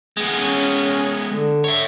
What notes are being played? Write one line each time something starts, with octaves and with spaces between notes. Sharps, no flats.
G#3 B3
C#4
D3
C#5 E5